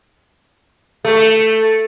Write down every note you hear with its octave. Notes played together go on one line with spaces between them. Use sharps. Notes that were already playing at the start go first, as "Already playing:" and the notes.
A3